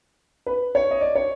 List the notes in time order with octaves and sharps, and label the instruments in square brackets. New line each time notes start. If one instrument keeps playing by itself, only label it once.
[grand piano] B4
C#5
D#5
D5
C#5